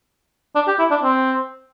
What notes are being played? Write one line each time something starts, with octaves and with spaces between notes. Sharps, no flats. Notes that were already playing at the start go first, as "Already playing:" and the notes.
D4
G4
E4
D4
C4